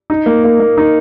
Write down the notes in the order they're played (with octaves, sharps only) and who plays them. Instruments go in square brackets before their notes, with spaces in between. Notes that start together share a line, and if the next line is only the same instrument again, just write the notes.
[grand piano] D#4
A#3
A#3
A#3
D#4